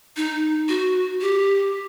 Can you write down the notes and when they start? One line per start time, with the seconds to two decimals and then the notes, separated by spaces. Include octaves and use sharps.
0.17 D#4
0.69 F#4
1.21 G4